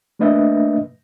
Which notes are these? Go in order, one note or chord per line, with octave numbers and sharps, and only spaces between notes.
A3 A#3 D4 B4 D#5 E5